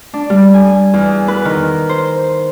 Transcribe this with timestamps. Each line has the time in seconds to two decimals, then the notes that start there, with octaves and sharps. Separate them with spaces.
0.14 D4
0.30 G3
0.54 G#5
0.94 E2
1.28 B4
1.45 D#3
1.89 C5